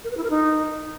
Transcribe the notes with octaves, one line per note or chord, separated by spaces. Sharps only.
A#4
B4
E4
A#4
D#4